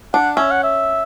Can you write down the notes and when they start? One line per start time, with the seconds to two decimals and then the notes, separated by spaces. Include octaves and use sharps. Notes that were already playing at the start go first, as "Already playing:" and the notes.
0.14 D4 F#5
0.37 C#4 E5
0.51 F#5
0.64 E5